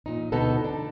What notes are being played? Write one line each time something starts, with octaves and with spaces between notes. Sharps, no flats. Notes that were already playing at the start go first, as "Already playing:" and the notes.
A#2 D#4
D2 B2 B3 D#4 A4
D4